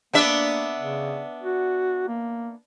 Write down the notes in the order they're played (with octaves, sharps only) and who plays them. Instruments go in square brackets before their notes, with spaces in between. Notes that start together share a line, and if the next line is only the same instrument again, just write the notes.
[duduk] A#3 [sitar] B3 D4 E5
[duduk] C#3
F#4
A#3